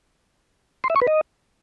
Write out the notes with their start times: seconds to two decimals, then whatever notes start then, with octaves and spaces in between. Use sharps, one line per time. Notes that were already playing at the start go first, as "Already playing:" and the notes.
0.84 C6
0.90 E5
0.96 C#6
1.02 B4
1.07 D#5